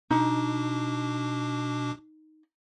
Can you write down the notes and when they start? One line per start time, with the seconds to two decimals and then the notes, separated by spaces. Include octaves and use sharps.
0.11 B2 D4 D#4 D6